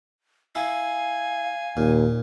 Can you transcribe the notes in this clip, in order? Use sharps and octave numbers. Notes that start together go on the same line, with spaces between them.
E4 F5 G#5
D#2 A#2